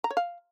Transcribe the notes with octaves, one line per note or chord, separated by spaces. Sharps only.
A#5
C#5
F5